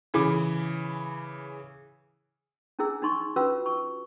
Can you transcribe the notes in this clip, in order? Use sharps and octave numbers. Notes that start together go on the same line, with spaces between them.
C#3 E3 B5 D6
C#4 D4 E4 G#4 E6
D4 D#4 C6 C#6
C#4 F4 F#4 B4 E6
C#6